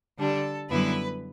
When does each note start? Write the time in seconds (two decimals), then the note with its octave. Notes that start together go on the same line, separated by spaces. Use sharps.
0.18 D3 G3 D4 A4
0.70 F#2 D3 G3 B3 E4 B4